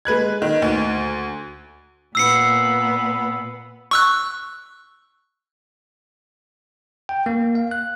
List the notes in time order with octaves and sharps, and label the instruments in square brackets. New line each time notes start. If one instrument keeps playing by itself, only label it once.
[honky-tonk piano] G#3 B4 F#6 G#6
D#3
D2
[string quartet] A#2 B3 [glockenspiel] E6 C7 C#7
[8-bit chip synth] C#6 E6 F#6
[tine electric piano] G5
A#3
F5
F#6